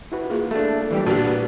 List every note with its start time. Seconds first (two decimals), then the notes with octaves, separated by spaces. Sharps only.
0.12 E4 F#4 B4
0.30 A#3 F4 G#4
0.51 A3 D4
0.91 E3 G3 G4
1.06 A#2 A#3 B3 D4 F#4 G4